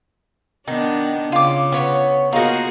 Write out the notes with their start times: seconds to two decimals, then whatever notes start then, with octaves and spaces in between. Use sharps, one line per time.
0.68 D#3 B3 D4
1.32 C#3 F4 D6
1.72 B3 C#5
2.33 A#3 B3 D#4 F4 F#4 G#4